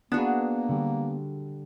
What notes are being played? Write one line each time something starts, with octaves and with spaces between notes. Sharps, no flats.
A#3 B3 D4 F#4 G#4 A5
D3 G3